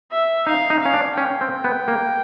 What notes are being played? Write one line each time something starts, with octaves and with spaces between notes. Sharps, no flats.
E5
D#4 F5
D#4
C#4 F5
D4
C#4 G5
C4
B3
A#3